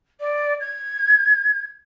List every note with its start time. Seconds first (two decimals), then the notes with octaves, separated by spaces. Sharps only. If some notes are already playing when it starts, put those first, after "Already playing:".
0.20 D5
0.60 G#6